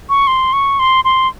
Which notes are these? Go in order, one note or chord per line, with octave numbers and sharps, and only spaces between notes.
C#6
C6
C#6
C6
C6